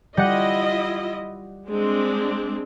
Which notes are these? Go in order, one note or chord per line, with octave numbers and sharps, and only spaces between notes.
G3 E4 F4 D#5 F#5
G#3 C4 D4